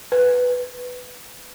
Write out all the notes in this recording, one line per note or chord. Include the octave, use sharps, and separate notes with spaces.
B4